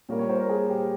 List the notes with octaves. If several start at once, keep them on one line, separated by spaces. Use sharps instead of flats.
A#2 G3 A#3 C#5
C#5
C5
A#4
G#4
G4